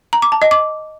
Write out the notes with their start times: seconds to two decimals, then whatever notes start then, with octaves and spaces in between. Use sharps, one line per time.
0.13 A#5
0.22 D6
0.32 A5
0.42 D#5
0.51 D6